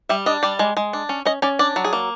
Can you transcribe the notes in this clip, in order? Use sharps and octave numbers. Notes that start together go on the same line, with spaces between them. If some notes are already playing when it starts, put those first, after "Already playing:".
G3 E5
D4 D#5
G3 D5
G#3
G#3
D4
C#4
C#4 D#5
C#4 D5
D4 D5
F#3
G#4
A#3